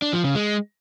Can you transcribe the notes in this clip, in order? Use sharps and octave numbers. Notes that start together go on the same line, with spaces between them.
D4
F3
C#3
G#3